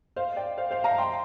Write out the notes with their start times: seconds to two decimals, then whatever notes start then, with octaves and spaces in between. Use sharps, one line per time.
0.16 C5 F5
0.36 D5 G5
0.58 C5 F5
0.71 C5 F5
0.84 F5 A#5
0.98 G5 C6